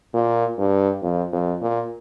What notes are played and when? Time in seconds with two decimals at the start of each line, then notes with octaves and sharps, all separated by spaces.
0.14 A#2
0.58 G2
1.02 F2
1.33 F2
1.62 A#2